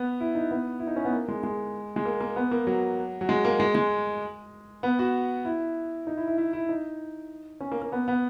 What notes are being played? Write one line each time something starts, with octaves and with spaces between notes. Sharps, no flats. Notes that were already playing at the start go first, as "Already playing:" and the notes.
Already playing: B3
E4
D#4
B3
E4
D#4
C#4
B3
A#3
G#3
G#3
G#3
A#3
A#3
B3
A#3
F#3
F#3
G#3
A#3
G#3
G#3
B3
F#4
E4
D#4
E4
E4
E4
E4
D#4
C#4
A#3
A#3
B3
B3